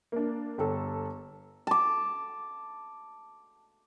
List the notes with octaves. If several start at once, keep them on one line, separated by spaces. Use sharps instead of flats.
A#3 D4
G1 A4
A5 D6